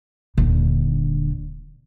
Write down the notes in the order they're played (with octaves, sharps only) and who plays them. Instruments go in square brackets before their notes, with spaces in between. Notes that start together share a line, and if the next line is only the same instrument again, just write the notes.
[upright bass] D#1 D3